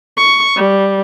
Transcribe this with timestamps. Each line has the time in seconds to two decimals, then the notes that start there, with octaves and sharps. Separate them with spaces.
0.17 C#6
0.56 G3